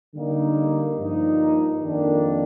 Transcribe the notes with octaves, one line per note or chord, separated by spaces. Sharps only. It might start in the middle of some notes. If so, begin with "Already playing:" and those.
D3 G3 A#3 D#4
G2 F3 A#3 D#4
F2 D#3 A#3 D4